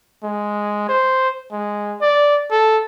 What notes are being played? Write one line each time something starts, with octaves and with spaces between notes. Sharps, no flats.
G#3
C5
G#3
D5
A4